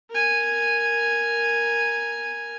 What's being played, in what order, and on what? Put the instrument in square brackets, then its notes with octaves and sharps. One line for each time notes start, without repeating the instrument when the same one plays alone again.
[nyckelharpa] A#4 G#5